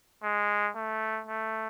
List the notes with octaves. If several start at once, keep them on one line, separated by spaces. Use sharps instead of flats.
G#3
A3
A3